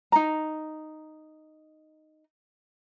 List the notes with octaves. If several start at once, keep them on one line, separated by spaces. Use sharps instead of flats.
D#4 A#5